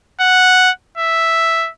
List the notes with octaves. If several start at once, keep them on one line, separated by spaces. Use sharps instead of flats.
F#5
E5